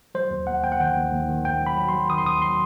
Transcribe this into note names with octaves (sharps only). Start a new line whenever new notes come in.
F#3 C5
D#2
D#2 F#5
D#2 G5
F#5
D#3 G5
D#2
D#2
D#3
D#2 G5
F#3
B5
F#3
C6
F#3
D#3 D#6
C6
D#2 D#6
F#3 C6